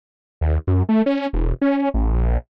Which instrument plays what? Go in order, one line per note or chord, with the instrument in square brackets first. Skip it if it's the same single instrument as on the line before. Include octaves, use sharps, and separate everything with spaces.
[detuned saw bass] D#2
F#2
A3
C#4
E1
C#4
A1
A#1